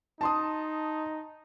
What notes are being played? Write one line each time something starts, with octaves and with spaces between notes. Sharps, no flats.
D#4 A5 C6 D#6